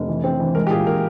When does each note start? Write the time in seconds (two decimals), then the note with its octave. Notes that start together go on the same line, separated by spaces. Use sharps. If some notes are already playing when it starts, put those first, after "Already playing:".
Already playing: F1
0.08 E3
0.24 C4
0.40 E3
0.55 G#3 A#4
0.67 G4
0.70 A#2 G#4
0.87 A#2 A#4